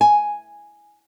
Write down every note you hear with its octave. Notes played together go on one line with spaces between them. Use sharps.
G#5